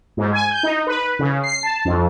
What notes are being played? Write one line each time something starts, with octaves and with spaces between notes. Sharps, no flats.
G#2
G#5
G6
D#4
B4
C#3
C7
A5
F2